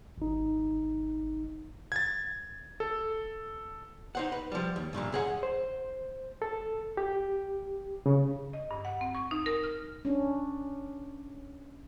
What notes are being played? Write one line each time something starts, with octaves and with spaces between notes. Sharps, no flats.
G#1 D#4
G#6 A6
A4
D#4 C5 F#5
B4
F3 G3
D#2
C2 G2 A#2 D3
F#2 G#4 F#5
C5
A4
G4
C#3
D#5
G2
F#5
C4
C#6
D#4
A#4
F6
C#4 D4